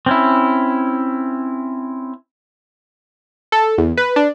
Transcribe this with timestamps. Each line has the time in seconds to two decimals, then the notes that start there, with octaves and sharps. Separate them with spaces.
0.06 C4 C#4 E4
3.52 A4
3.78 E2
3.97 B4
4.16 D4